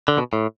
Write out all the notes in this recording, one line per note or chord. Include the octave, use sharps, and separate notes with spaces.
D3
B2
A2